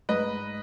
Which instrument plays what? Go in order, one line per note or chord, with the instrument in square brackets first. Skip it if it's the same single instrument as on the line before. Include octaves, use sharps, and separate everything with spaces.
[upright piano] G#2 B4 D#5